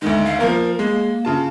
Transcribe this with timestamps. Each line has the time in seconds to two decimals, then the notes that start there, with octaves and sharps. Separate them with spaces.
0.02 D2 D3 D#3 G#3
0.26 F5
0.40 F3 A#3 A#4
0.79 G#3 A#3
1.25 C#3 F4 A5